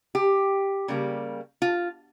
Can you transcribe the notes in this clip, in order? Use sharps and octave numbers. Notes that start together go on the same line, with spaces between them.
G4
C#3 G3 A#3
F4